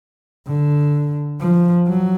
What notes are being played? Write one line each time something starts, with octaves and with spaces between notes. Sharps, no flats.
D3
F3
F#3